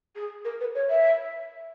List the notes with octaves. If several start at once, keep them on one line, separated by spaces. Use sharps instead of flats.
G#4
A#4
B4
C#5
E5